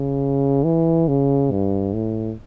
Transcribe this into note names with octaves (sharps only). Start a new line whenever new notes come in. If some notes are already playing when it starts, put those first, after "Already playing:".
Already playing: C#3
E3
C#3
G2
A2